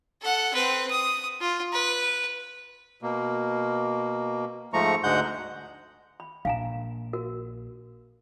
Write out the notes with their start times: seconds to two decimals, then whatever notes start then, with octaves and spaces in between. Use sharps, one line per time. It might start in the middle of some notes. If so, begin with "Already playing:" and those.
0.21 A4 F#5
0.53 C4 B4
0.90 D#6
1.41 F4
1.72 B4
3.02 B2 A#3
4.73 G#2 F3 A3 A#5 C#6
5.04 D2 G#2 G#3 F#5 G6
6.20 B5
6.45 A#1 F5 G#5 A#5
7.13 F#4 A#4